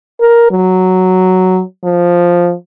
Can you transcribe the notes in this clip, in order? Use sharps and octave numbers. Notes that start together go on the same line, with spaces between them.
A#4
F#3
F3